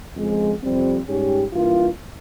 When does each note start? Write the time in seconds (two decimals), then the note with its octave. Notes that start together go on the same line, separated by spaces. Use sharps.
0.16 F2 C#3 F3 G#3
0.62 F2 C3 G3 C4
1.07 G#2 G3 C#4 G4
1.52 G2 E3 A#3 F4